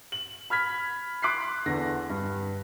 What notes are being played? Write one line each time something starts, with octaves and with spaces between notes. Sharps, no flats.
F#7
B5 F6 G#6 B6
C6 D6 F#6 B6 C7
E2 D3 A#6
G2